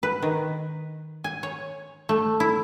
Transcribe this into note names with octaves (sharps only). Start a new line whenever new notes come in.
B4
D#3
G#5
C#5
A3
E4